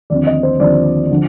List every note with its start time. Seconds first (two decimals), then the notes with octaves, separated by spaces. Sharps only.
0.10 D#2 D3 F3 C4 D5
0.27 D#5
0.43 C5
0.60 D#2 D3 F3 C4 D5
1.11 D3 F3